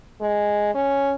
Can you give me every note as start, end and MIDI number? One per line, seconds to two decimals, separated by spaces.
0.21 0.74 56
0.75 1.15 61